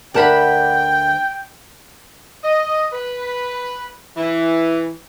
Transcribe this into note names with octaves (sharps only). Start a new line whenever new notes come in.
D2 A#4 D5 F#5 G5 A5 B5
D#5
B4
E3